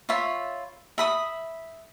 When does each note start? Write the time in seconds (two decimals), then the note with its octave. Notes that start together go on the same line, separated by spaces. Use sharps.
0.09 F4 C#5 E5 B5
0.98 E5 B5 D#6